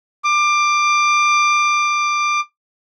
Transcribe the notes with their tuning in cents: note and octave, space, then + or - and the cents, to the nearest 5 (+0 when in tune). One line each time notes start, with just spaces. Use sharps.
D6 +20